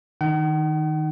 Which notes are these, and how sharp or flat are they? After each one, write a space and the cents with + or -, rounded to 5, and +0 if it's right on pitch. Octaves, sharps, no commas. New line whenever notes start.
D#3 +0 D#4 +0 F#5 +45